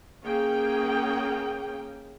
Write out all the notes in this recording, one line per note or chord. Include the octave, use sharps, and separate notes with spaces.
A#3 C#4 G#4 G5